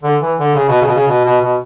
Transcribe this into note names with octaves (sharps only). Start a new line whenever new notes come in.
D3
E3
D3
C#3
B2
C#3
B2
C#3
B2
B2
B2